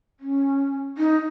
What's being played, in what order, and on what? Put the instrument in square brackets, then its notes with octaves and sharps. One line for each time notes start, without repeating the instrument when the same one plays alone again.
[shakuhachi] C#4
D#4